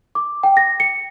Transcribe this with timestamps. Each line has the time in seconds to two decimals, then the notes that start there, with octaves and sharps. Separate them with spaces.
0.15 D6
0.43 G5
0.57 A#6
0.80 C#7